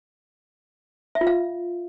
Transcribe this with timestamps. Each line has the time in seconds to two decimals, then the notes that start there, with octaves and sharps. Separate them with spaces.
1.15 E5
1.21 F4
1.27 F5